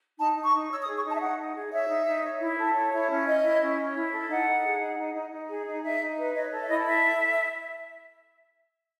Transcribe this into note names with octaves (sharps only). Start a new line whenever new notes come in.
D#4 A5
D#4
C#6
D#4
C#5 E6
D#6
G#4
C#6
D#4 A5
E5
D#4 F#5
D#4
G#4
C#5 E5
D#4
D#4
C#5
E4
A4
C#5
E4
C#4
C#5 D#5
E4
C#4
C#5
E4
A4
D#4 F#5
D#4
G#4
D#4
D#4
D#4
D#4
G#4
D#4
D#4 E5
D#4
B4
C#5 D#5
A4
E5
E4 D#5
A4 E5